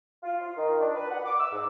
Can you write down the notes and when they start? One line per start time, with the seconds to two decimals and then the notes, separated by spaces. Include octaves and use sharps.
0.23 F4
0.40 F4
0.57 D#3
0.81 D4
0.95 B4
1.10 F#5
1.25 D6
1.39 E6
1.52 G#2